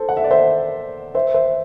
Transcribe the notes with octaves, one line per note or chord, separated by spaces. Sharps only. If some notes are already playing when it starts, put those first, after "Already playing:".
Already playing: A4 C5
F#5
E5
D5
C5 E5
C5 E5
C5 E5